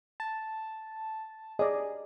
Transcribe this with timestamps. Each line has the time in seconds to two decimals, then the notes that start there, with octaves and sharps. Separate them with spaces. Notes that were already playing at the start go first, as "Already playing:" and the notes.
0.20 A5
1.59 G#4 D5 D#5